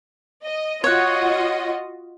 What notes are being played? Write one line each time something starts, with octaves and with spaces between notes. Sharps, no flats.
D#5
F4 F#4 C#5 D#5 F#5